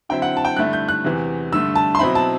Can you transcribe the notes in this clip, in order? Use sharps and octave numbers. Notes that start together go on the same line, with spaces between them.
D3 F#3 C4 E4 G5
F#5
A5
G5
G2 D3 A3 E4 F#6
G6
F#6
E2 C3 E3
G2 D3 A3 E6
A5
C6
B2 F#3 C4 E4 B5
A5